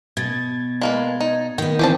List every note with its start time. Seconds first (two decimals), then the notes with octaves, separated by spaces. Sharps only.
0.17 B2 G#6 A6
0.81 G#3 A#3 B4
1.20 D#4
1.58 D#3 B3 G5
1.79 E3 C4 G4 G#4 A5